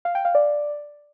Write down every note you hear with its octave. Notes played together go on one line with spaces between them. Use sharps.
F5
G5
F5
D5